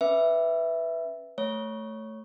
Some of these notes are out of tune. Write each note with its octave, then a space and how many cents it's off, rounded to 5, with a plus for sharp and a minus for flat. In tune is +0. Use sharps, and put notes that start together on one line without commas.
C#4 -10 B4 +0 E5 +0
A3 +0 C#5 +0